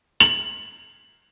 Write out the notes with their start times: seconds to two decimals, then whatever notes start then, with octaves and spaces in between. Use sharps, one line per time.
0.20 F#7